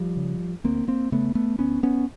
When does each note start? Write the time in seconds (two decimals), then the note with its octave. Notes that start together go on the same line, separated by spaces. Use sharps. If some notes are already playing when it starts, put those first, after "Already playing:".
Already playing: F3 G3
0.17 C#3
0.64 D2 A#3 C4
0.88 A#3 C4
1.12 C#3 A3 B3
1.35 A3 B3
1.59 D2 B3 C#4
1.83 B3 C#4